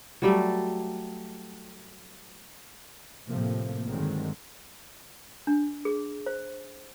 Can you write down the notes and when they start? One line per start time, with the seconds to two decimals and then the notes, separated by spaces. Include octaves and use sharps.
0.22 F#3 G3 A3
3.29 A2 C3 F3 A3 A#3
3.88 G2 D3 D#3 F#3 G#3 C4
5.47 D4
5.85 G#4
6.26 C5